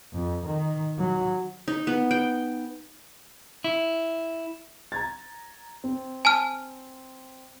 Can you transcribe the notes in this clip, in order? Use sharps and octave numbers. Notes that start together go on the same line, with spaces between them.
F2
D#3
F#3
D#4
B3
G5
E4
A#5 G#6 A6
C4
G#5 A5 F6